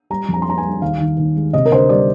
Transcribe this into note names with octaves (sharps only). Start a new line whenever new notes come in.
G3 A#5
F2
A#5
C6
G3 A#5
G#5
G3
D#2 F5
D#3
D#2
G#3
C3 D#5
A#4
D2 C5
G3 D5